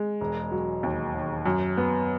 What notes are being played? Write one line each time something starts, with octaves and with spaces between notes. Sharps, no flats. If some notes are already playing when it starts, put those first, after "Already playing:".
Already playing: G#3
E1
F#3
D#2
D#3
F#2
B3